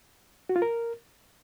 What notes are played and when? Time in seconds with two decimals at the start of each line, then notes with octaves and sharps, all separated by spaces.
0.49 F#4
0.56 F4
0.62 A#4